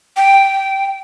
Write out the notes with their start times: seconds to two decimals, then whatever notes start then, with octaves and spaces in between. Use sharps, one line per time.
0.17 G5